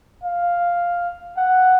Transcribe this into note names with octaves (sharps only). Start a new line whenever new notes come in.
F5
F#5